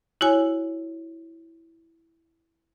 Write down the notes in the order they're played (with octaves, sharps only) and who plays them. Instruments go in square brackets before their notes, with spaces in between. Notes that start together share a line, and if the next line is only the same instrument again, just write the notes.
[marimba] E4 F#4 C#5 G#5